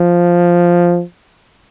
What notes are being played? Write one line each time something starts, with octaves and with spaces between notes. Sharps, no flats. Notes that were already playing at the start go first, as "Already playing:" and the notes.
Already playing: F3